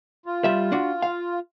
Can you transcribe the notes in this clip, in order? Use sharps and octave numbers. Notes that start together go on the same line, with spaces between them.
F4
G3 E5
D4 F#4
F5